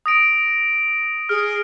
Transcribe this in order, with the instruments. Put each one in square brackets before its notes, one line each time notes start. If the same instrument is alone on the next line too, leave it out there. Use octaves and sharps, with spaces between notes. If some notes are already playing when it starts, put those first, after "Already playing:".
[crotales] D#6 A#6 D7
[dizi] G#4 [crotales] F6